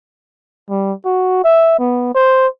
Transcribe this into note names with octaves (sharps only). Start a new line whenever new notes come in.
G3
F#4
E5
B3
C5